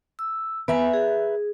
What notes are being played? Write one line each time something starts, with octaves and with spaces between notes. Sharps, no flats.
E6
B3 B4 E5 G#5 A#5
G#4